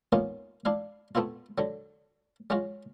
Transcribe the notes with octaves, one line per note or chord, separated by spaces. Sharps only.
A#3 B3 C#4 D#4 F4
D4 E4 F5
A3 B3 C4 E4 F4
D3 F#3
F#3 G#3 C#4 F4 F#4